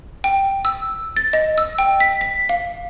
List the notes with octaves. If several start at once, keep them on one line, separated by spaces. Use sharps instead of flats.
G5
E6
A6
D#5
E6
G5
B6
B6
F5